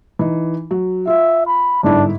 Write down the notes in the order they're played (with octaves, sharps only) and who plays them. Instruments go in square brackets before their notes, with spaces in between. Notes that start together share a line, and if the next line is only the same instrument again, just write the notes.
[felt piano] E3 D#4
F#3
[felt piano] F4 [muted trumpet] E5
[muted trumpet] B5
[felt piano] G1 G#2 E4 [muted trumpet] D4